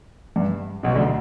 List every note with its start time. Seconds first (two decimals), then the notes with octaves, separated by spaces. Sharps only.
0.36 G2
0.83 B1 B2
0.95 D2 D3